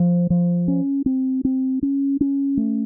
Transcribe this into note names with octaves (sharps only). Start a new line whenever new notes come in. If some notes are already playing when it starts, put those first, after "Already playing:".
Already playing: F3
F3
C#4
C4
C4
C#4
C#4
A3